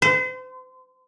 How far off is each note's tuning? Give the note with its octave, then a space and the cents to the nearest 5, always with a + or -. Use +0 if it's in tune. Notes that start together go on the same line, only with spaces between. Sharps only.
C5 -40